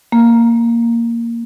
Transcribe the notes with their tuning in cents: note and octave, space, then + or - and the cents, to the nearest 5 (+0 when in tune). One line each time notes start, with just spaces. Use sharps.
A#3 -5